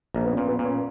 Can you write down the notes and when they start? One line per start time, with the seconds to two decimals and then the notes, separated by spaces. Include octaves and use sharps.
0.15 A#1 A#3
0.25 B3
0.31 C#4
0.37 A#2
0.48 B3
0.59 A#2
0.65 C#4